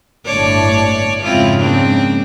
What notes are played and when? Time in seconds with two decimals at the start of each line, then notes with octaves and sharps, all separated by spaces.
0.25 G1 A2 D4 C#5 D5
1.22 F2 G#2 C#3 C4 E4 F4
1.60 A#3 C4 D4